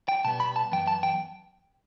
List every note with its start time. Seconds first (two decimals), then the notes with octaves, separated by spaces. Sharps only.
0.09 G5
0.24 B2 G3 B3 A5
0.40 B5
0.56 A5
0.72 F#2 E3 B3 G5
0.87 A5
1.03 G5